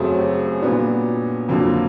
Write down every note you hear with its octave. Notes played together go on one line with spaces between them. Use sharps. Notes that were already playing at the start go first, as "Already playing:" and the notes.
Already playing: F#2 C#3 F#3 A3 C4 G#4
G4
A#2 G3 B3 D4 F#4
F2 D3 F#3 A#3